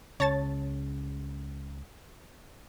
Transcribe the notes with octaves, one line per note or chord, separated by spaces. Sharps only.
C#2 C#3 C#5 A5 A6